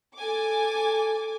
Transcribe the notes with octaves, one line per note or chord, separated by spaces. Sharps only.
A4 G#5 D6